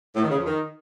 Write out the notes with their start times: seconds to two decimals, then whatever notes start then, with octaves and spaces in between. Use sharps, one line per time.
0.15 A2
0.23 D#3
0.31 C#3
0.38 F2
0.46 D#3